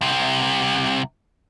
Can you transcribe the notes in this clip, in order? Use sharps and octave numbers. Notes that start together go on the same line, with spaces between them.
C2 C3